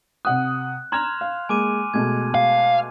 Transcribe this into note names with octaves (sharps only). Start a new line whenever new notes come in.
C3 F#5 D#6 F#6
A#5 C6 F6 G#6 E7 F7
F5
G#3 A#3 G#5 D6 D#7
B2 G#3 A3 G#6
F5